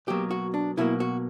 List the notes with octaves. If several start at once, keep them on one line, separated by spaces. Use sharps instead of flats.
B1 B2 F#3 A#3 G4
F#4
D4
B1 B2 F#3 A#3 E4
F#4